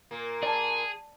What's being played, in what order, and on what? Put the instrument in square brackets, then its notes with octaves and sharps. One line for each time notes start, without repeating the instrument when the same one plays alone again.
[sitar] A#2 A#3
[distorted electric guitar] G#4 [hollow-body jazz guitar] D5 A5